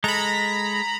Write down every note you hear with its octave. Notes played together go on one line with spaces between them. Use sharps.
G#3 A4 A#5 B5